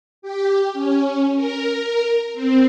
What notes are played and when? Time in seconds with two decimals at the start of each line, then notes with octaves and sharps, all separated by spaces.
0.22 G4
0.73 C#4
1.36 A#4
2.34 C4